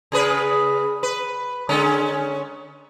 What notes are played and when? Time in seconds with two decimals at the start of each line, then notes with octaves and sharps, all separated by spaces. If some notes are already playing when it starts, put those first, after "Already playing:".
0.12 C#3 G#4 B4
1.03 B4
1.69 D3 G#3 C#4